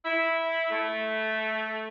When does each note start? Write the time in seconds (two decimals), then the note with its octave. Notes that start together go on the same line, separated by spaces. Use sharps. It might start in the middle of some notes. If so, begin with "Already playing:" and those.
0.05 E4
0.70 A3